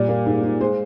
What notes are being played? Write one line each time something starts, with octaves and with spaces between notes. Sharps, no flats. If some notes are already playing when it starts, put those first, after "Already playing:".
Already playing: A#2 G3 D5
A#3
G#2
G#2
G#3 C5